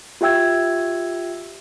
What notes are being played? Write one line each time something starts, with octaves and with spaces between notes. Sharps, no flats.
F4 G4 E5 G5 E6 G#6